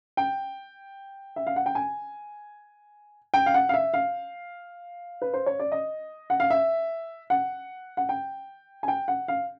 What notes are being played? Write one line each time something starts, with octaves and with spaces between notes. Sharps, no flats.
G5
E5
F5
F#5
G5
G#5
G5
F5
F#5
F5
E5
F5
B4
C5
C#5
D5
D#5
F#5
F5
E5
F#5
F#5
G5
G#5
G5
F#5
F5